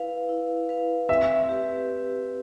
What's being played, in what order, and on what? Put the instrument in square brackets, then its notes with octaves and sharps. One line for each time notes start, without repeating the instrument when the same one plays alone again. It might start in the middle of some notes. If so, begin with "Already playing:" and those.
Already playing: [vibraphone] E4 B4 F5
E4
B4 F5
[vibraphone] C4 [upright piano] E5
[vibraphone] G4 B4